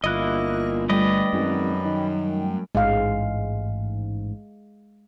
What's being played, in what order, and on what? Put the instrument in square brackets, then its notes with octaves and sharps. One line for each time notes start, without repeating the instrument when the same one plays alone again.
[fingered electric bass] G1 [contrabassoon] A#2 [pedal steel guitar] A#3 E4 D#5 [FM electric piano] F#6 A#6
[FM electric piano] G3 A3 G5 [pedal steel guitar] B4 D5 D#5
[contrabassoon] G#1 [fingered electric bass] F#2
[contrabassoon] D#3
[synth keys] A1 G#2 [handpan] G#3 F5